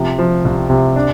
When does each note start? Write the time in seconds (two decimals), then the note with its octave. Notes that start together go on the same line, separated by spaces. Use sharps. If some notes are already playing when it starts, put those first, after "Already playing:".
Already playing: C3 F3
0.19 F3
0.45 C2
0.70 C3
0.96 D4